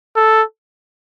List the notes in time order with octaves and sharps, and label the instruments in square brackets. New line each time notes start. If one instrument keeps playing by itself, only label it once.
[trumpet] A4